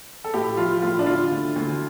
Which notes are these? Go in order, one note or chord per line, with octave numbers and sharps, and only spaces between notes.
A4
A2 G4
F3 F4
A2 F4
D4
D3 F4
D2
D2